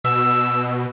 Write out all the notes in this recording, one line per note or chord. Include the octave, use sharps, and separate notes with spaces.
B2 E6